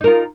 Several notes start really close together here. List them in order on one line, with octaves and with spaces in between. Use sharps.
D#4 A#4 F4